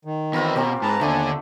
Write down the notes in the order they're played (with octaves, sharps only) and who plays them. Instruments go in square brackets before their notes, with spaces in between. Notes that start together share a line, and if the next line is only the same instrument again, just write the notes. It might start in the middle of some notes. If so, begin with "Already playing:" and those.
[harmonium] D#3
[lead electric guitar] E2 B4 [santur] C4 F4 A#5
[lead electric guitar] B2 [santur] A#3 C4 G4
[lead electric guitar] G#2 [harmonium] B4 A5 A#5
[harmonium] D#2 G#5 [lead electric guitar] D3 [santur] A3 B3 D4